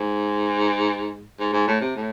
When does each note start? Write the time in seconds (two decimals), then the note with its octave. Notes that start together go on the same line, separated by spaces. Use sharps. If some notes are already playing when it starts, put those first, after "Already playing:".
Already playing: G#2
1.39 G#2
1.53 G#2
1.67 A2
1.81 C3
1.96 A2